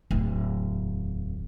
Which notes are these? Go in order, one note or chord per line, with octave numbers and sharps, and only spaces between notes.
D1 E2